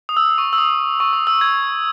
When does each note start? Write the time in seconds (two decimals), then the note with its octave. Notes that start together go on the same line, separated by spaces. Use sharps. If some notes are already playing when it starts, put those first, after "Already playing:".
0.09 D#6
0.17 E6
0.38 C#6
0.53 E6
0.58 D#6
1.00 C#6
1.13 D#6
1.27 E6
1.41 G#6